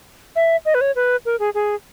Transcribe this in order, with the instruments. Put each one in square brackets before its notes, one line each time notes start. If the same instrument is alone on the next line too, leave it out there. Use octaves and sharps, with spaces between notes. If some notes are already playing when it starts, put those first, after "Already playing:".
[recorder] E5
D#5
B4
C#5
B4
A#4
G#4
G#4